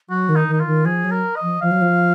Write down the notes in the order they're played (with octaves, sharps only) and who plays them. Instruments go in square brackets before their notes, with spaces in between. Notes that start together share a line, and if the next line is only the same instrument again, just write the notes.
[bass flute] F#3 [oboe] F#4
[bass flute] D#3
[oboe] D#4
[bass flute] D#3 [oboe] D#4
[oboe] F4
[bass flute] D#3
[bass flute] F3 [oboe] G#4
[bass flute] F#3
[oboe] A#4
D#5
[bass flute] F3
[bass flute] F3 [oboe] F5
[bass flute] F#3
F3